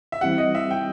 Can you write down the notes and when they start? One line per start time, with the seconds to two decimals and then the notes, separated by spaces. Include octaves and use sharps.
0.12 E5
0.21 E3 G3 C4 E4 G4 F#5
0.38 D#5
0.55 E5
0.71 G5